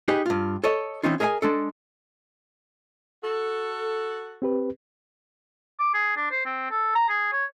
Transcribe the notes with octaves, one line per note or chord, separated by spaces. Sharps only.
D#4 G4 G#4 B4 D#5
G2 F4
A4 C#5 D#5
E3 C4 C#4 D#4 F4
G#4 A#4 D#5 E5 G#5
G#3 D4 A4
F#4 A4
C4 G4 B4
D6
G#4
D4
C5
C4
A4
A#5
G#4
C#5